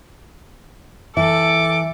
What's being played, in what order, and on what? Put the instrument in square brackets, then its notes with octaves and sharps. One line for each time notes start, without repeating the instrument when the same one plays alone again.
[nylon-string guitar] E3 [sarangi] A4 [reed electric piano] E5 [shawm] D6